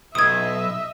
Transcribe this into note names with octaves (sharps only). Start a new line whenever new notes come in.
B1 D#5 E5 D#6 G#6